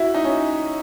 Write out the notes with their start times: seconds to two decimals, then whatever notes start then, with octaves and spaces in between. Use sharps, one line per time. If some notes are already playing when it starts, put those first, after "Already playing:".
Already playing: E4 F#4
0.14 D#4
0.24 C#4